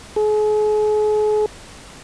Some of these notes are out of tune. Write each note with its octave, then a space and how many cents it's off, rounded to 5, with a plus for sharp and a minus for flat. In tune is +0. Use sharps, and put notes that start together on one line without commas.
G#4 +40